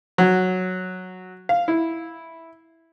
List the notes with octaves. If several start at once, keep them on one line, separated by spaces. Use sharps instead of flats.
F#3
F5
E4